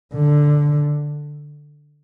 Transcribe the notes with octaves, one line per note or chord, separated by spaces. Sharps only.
D3